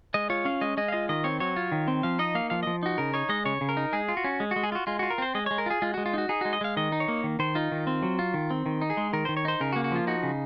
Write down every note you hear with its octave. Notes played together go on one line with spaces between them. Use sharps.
G#3 D#5
F4 C#5
C#4 F5
G#3 D#5
G#3 D#5
F5
F4 D#5
D#3 D#5
C4 C#5
F#3 C#5
F4
D#3
C4
F3 F5
D#4 D#5
A#3 F5
F3 F5
F3 D#5
D#4 F#4
C#3 A#4
D#4 C#5
G#3 D#5
C#3 C#5
C#3
A#4
D#4
G#3 G#4
F4
F#4
C#4
G#3
G#3 F#4
G#4
F4 F#4
G#3 F4
F4 F#4
A#4
C4 C5
G#3 D#5
G#3 C#5
A#4
F4 G#4
G#3 F4
G#3 F#4
F4
D#4 F#4
D#4 G#4
G#3 F#4
D#5
G#3 F5
D#3 D#5
D#4
C#5
A#3
D#3
D#3 C5
D#4 F4
D#3
C4
F#3
F4
D#3
C4
D#3
D#4
G#4
G#3
D#3 A#4
D#3 C5
C#5
D#4 C5
C#3 A#4
F#4
A#3
F#4
F3 F4
D#4 F#4
C#3